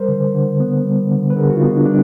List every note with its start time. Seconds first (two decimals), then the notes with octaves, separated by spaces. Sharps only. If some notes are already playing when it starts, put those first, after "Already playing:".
Already playing: G3 A#4 C5
0.09 D3
0.34 D3
0.60 B3
0.85 G3
1.11 D3
1.30 B4
1.36 D3 G#4 A#4
1.50 F#4
1.56 D#4 F4
1.62 B3
1.75 D4 E4
1.85 G3 D4